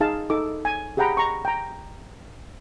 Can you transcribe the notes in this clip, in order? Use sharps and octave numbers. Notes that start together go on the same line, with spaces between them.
D#4 G#4 F5 A5
D#4 A4 D6
G#5
G4 G#4 F#5 G5 A#5 B5
A#5 C#6
G5 A#5